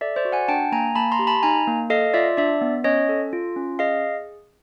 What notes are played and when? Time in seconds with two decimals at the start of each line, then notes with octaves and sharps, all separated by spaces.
0.01 A4 D5 E5
0.16 C5 D5
0.25 F#4
0.32 F#5 G#5
0.48 D4 G5 A5
0.72 A#3 G#5 A#5
0.95 A#3 A5 B5
1.12 A#5 C6
1.19 G4
1.27 A5 B5
1.43 D#4 G#5 A#5
1.67 A#3
1.90 A4 D#5 F5
2.14 F4 D5 E5
2.37 D4 D5 E5
2.61 B3
2.84 C#4 C#5 D#5
3.09 A4
3.33 F4
3.56 C#4
3.79 G#4 D#5 F5